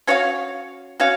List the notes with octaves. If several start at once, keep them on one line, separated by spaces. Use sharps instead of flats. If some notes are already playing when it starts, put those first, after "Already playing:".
C#4 F#4 C#5 F5
C#4 F#4 C#5 F5